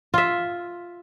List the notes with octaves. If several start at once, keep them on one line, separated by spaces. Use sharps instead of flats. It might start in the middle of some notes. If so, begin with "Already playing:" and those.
F4 E5